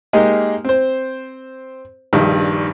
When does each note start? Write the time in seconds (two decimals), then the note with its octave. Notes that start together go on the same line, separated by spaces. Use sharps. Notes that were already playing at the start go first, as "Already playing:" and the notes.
0.13 G#3 A#3 D#4 G4
0.64 C4 C5
2.13 A#1 G2 D#3